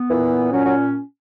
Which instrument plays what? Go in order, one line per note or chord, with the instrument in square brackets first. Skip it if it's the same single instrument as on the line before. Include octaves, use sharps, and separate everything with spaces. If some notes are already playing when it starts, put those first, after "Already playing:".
Already playing: [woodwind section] B3
[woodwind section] A#2 [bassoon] E3
[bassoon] F#3 [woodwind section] C#4
[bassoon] F#3